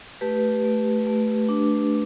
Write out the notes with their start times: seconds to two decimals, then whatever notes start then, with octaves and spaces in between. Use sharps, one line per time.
0.21 A3 G4 B4
0.64 A3
1.07 A3
1.49 D4